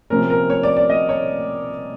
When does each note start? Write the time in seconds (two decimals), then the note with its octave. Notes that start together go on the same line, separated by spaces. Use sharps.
0.10 C3 F3 A#3 C#4 A#4
0.30 A#4
0.50 C#5
0.63 D5
0.77 D5
0.90 D#5
1.09 C#5